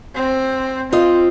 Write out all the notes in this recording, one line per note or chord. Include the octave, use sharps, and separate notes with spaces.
C4
C4 F4 D#5